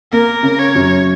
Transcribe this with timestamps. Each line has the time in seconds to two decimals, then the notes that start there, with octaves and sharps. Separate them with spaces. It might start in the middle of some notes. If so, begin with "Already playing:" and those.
0.12 A#3 A#4
0.43 C#3
0.59 C#5
0.75 F#2